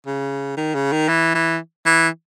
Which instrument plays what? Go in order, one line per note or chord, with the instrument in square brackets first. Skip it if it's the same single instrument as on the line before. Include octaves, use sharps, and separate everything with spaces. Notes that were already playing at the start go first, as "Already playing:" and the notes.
[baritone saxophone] C#3
D#3
C#3
D#3
E3
E3
E3